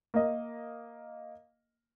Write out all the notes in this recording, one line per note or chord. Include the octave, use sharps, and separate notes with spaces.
A#3 D#5